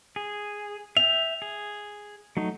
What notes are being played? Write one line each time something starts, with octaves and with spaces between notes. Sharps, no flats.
G#4
E5 G5 F7
G#4
F#3 A3 D#4